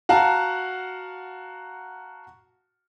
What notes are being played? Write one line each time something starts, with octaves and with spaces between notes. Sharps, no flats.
F#4 F5 F#5 A5 A#5